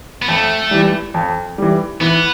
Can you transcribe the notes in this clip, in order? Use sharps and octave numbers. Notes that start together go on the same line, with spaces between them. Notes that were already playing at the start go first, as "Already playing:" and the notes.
B3
F2 A3
E3 G3
F2
E3 G3
E3 B3